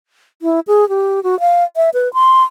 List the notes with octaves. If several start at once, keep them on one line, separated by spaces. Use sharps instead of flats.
E4
G#4
G4
F#4
F5
E5
B4
C6